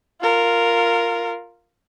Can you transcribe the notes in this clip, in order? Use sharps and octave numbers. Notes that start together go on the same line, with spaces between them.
F4 A#4